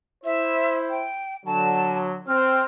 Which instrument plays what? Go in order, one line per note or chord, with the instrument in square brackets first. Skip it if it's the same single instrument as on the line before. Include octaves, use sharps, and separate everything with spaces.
[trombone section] E4 C5 [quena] E5
[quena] G5
[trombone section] D3 F#3 [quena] A5
[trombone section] C4 [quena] F6